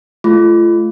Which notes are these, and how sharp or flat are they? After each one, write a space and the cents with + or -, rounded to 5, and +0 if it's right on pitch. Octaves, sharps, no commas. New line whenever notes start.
A3 -20 F4 -30